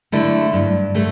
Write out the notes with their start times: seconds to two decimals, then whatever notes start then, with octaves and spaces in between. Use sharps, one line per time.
0.12 D3 A3 E4
0.53 G2
0.94 D3 A3